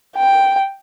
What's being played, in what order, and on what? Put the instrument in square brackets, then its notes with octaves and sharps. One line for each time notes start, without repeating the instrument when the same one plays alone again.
[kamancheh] G5